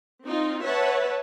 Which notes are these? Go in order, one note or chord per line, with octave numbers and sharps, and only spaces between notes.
C4 D#4 F4
B4 C#5 E5 F#5 A5